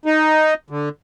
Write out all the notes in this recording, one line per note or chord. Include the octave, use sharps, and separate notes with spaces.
D#4
D3